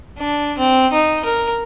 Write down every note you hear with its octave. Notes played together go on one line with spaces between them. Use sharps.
D4
C4
D#4
A#4